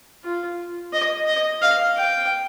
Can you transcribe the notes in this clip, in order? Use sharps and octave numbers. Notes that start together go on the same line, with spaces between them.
F4
D#5
D#5
F5
G5